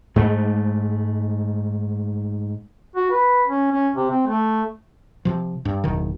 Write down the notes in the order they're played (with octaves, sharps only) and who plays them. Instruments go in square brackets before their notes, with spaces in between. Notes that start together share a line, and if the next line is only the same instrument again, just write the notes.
[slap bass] G#2 G#3 A3
[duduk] F#4
B4
C#4
C#4
C3
C4
A3
[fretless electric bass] C3 F3
G2
F#1 E2 B2 D#3